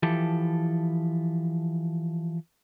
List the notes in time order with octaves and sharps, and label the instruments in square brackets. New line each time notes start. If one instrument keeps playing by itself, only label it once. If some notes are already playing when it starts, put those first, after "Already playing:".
[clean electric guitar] E3 F3 G4 A4